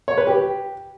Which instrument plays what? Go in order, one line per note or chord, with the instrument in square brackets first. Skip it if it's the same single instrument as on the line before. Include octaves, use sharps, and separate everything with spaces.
[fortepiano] C#5
B4
G4